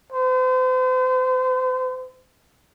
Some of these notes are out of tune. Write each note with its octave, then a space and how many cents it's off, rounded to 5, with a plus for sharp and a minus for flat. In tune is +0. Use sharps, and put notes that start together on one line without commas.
C5 -40